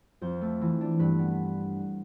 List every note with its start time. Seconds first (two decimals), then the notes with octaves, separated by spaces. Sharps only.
0.21 F2 C5
0.41 A3
0.61 E3
0.81 D4
0.99 G2 B4
1.19 B3